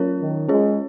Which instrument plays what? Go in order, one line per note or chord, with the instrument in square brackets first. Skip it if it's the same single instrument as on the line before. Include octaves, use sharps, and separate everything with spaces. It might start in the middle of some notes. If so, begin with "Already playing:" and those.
Already playing: [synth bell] F#3 C#4 F4 A#4 C#5
[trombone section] D#3
[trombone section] G#3 [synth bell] C#4 F4 G#4 C#5